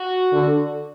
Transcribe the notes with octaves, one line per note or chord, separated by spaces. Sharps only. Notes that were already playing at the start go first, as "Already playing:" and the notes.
Already playing: F#4
D3